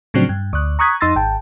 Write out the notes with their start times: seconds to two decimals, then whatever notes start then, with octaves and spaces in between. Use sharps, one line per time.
0.14 A2 C#3 F3 F#3 C4 D4
0.29 G2
0.53 D2 F#6
0.79 A#5 C#6 D#6 F#6 G#6 B6
1.01 F2 D#4 C6 E6 A6 A#6
1.16 G#1 G5 A5